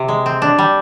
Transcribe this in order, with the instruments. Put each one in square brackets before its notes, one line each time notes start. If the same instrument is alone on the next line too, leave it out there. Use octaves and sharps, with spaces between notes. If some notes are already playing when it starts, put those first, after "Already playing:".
Already playing: [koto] C3
G#3
C4
D4
G3